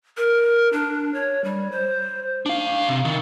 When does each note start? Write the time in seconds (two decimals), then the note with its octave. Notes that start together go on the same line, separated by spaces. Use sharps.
0.17 A#4
0.73 D4
1.14 C#5
1.44 G3
1.72 C5
2.46 D4 F5
2.88 C3
3.05 D#3